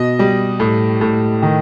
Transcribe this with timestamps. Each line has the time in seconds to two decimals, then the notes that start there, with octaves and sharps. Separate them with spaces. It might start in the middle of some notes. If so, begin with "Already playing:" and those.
Already playing: B2 D#5
0.19 G3
0.60 A2
1.01 A2
1.42 D#3